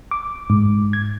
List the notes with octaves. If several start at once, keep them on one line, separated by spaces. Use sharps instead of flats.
D6
G#2
G#6